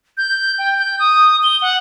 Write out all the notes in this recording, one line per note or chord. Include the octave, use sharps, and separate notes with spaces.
G6
G5
G6
D#6
G7
F#5